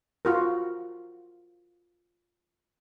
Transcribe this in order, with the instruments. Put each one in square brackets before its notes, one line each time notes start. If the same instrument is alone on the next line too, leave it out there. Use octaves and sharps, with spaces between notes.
[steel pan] F4 F#4 A#4